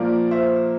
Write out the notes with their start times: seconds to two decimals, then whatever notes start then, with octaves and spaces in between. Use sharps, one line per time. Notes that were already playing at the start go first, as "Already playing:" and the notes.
Already playing: A#2 F3 A#3 A#4 D5
0.31 C5 E5